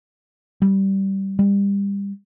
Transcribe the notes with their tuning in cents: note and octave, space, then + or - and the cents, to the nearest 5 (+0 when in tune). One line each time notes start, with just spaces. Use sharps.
G3 -15
G3 +30